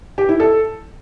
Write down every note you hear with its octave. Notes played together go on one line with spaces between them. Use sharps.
G4
E4
A4